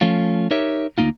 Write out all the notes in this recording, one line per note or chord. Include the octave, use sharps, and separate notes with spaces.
F3 A3 C#4 F4
D#4 G4 A#4 C#5 E5
D2 B2 A#3 D#4 F4